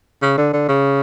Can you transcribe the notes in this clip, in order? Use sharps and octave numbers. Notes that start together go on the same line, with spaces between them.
C#3
D3
D3
C#3